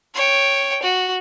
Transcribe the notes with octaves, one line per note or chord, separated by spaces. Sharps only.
C#5 G5
F#4